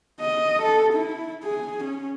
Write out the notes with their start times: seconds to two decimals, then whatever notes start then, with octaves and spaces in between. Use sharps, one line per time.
0.20 D#5
0.62 A4
0.94 E4
1.44 G#4
1.85 C#4